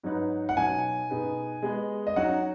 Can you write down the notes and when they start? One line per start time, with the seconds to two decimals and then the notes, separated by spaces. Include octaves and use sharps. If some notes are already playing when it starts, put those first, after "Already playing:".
0.03 G#2 F#3 D#4 B4
0.49 F#5
0.57 B2 F#3 D#4 G#5
1.10 B2 B3 D#4 G#4 B4
1.62 G#3 B3 G#4 D#5
2.07 D#5
2.16 F#3 D#4 F#4 F#5